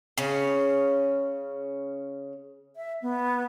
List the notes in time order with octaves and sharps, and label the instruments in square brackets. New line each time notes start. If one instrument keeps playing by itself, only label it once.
[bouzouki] C#3 C#4
[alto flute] E5
B3